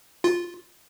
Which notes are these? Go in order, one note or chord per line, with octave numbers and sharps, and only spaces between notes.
F4